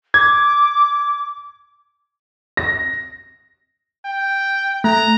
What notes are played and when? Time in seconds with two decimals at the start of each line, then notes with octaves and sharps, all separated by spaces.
0.14 D6 G#6
2.57 A#6
4.05 G5
4.84 A3 A#5